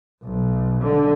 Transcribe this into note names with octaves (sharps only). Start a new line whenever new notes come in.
B1
D3